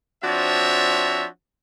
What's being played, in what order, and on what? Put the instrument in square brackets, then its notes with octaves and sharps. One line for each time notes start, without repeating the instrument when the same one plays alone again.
[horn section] F3 C4 D4 F#4 C#5 E5